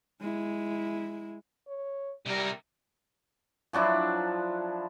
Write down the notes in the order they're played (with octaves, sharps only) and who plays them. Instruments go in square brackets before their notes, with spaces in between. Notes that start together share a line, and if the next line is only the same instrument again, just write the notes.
[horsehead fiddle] G#3 E4
[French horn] C#5
[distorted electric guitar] C3 A#4 [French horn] G3
[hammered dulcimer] F3 F#3 D4 E4